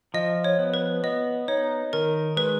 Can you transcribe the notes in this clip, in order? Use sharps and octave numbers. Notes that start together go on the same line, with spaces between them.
F3 D#5
C#5
B3
B4
B3 D#5
D#4 C#5
D#3 A#4
G#3 B4